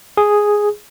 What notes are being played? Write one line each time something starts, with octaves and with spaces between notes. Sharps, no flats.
G#4